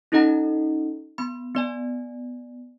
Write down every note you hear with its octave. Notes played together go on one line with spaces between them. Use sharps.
C#4 D#4 A4 D#5 F#5 A#5
B3 B5
B3 D5 G#5